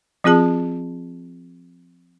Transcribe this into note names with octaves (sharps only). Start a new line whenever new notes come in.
F3 C4 F4 G#4 A5